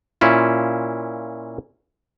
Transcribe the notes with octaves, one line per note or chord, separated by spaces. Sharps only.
A#2 C#4 E4 F4